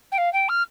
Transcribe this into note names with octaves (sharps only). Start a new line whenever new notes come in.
G5
F5
G5
F6